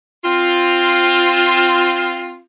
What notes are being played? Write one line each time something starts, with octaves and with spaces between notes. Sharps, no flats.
C4 F4